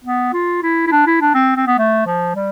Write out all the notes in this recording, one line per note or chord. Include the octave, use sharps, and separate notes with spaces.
B3
F4
E4
E4
D4
E4
D4
C4
C4
B3
A3
F3
G3